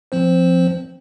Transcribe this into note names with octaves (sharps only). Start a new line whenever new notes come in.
F3 C4 C5